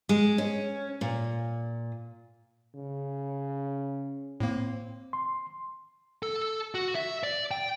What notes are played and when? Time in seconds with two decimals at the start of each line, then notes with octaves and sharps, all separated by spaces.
0.09 G#3
0.38 C#4
1.01 A#2
2.76 C#3
4.40 A2 A#3 C4
5.13 C6
6.23 A4
6.75 F#4
6.95 E5
7.23 D5
7.51 G5